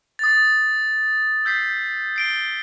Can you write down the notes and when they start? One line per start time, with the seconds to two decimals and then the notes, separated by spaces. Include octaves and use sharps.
0.19 D#6 A6
1.45 E6 G6 B6 C7
2.16 C7 D7 G7